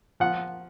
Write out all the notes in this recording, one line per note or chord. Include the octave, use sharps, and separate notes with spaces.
F3 F#5